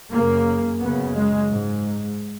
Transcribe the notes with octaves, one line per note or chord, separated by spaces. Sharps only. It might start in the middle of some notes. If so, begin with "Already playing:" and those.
F#2 C#3 A#3
F#2 C#3 B3
G#3
G#2